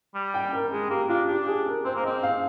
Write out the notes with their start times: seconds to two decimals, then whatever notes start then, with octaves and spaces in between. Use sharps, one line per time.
0.15 G3
0.34 G5
0.53 A#4
0.71 G#3 G#4
0.90 A#3 G4
1.09 D4 F4
1.27 D4 G4
1.47 G#4
1.66 A#4
1.85 C4 C5
1.95 A#3
2.03 D#5
2.06 C4
2.23 F5